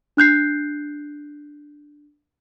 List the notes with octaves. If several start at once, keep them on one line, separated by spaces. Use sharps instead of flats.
D4 F#6 G6 C7